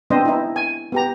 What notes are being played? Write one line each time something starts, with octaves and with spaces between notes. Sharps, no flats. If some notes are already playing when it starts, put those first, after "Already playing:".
B3 C4 D4 C5 D#5
D#4 E4
G#5
B3 G4 A#5